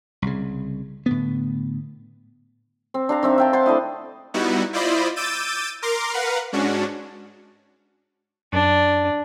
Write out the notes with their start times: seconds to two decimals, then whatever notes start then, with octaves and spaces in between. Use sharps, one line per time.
0.22 C2 C#3
1.06 A2 D3 B3
2.94 C4
3.09 D4 F5 A#5
3.23 D#3 C4 E5
3.38 E5 G5 A5
3.53 C5 F#5 A5 C6
3.66 A3 D4 E4 D#5
4.34 G3 B3 D#4 E4 F#4
4.73 E4 F4 C5 D5 D#5 B5
5.16 D6 E6 G6 A6 D#7
5.82 A#4 A#5 C6 D6
6.13 A#4 B4 F5 F#5
6.53 G#2 C#4 D4 F#4
8.53 F#2 D4